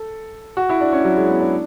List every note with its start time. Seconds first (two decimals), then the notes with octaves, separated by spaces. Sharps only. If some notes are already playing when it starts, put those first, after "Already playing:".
Already playing: A4
0.57 F#4
0.69 E4
0.81 D4
0.93 C#4
1.04 F#3
1.17 G#3
1.27 B3
1.40 D4